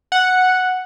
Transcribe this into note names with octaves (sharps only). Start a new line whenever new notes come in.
F#5